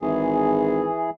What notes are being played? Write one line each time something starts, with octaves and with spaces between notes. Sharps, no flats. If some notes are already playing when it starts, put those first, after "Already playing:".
G#1 E3 G#4